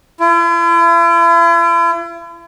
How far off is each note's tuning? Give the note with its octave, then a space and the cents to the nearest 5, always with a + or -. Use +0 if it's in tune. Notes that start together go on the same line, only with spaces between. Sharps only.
E4 +45